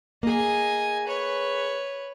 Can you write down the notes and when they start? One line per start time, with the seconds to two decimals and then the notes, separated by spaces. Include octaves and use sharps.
0.23 A#3 G#4 D#5 G#5
1.07 B4 C#5